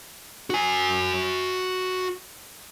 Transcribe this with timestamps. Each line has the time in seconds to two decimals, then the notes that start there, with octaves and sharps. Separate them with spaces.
0.50 F#4 G#5